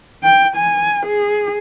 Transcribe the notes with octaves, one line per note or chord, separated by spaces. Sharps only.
G5
G#5
G#4